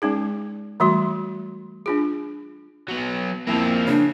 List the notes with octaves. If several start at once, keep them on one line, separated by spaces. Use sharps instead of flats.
G#3 C#4 D#4 G#4
E3 G3 A3 F#4 C6
D4 F4 G#4
F#3 B3
F2 F3 A#3 C4 E4
C#3 D4